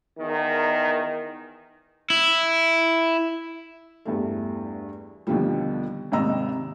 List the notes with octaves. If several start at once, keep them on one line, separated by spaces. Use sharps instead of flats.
E2 D#3
E4
E2 G2 A3
D#2 B2 D3 F3 G3
G#1 D#2 C3 D#5 A#5 E6